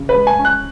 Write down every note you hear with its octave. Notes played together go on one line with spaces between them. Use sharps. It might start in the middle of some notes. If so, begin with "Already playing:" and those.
Already playing: C#3
B4
G#3
G#5
C#4
F#6